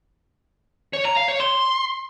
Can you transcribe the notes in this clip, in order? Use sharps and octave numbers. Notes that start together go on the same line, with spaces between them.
C#5
A#5
F5
C#5
C6